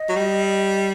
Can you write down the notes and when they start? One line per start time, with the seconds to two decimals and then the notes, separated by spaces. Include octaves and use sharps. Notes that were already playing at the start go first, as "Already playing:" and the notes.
Already playing: D#5
0.09 F#3
0.16 G3